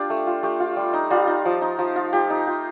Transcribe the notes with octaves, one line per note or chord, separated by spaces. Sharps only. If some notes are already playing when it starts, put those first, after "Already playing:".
Already playing: D4 F4 G4
A3
F4
A3 G4
F4
G3
D#4
G3 F4
D#4
F3
D#4
F3
F4
F3 G4
D#4
F4